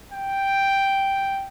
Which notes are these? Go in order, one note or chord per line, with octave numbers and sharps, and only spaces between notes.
G5